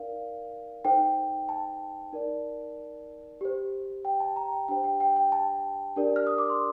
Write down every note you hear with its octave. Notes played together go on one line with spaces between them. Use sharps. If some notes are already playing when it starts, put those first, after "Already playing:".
Already playing: D#4 A#4 D5 F5
D#4 A4 C5 G5
A5
D#4 A#4 D5
G4 C5
G5
A5
A#5
G5
D4 G4 C5 G5
G5
G5
G5
A5
D4 G4 A#4 D5
F6
D#6
D6
C6